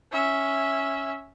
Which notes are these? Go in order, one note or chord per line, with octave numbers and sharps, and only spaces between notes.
C#4 E5